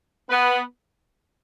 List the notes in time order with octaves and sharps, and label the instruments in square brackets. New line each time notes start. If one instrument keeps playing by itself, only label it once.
[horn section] B3 B4